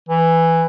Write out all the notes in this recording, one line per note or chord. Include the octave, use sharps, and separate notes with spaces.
E3